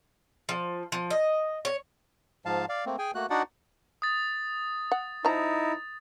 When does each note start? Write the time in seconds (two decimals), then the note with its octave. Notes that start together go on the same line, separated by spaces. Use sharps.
0.49 F3
0.92 F3
1.10 D#5
1.65 C#5
2.45 G#2 F3 F5 A5
2.69 D5 F5
2.86 A3 A#3 C4
2.98 G#4 G5 G#5
3.15 A3 A#3 F#4 F#6
3.30 D4 D#4 F#4 D5 F#5
4.02 D#6 A6
4.92 F#5
5.25 F3 D#4 E4 A#5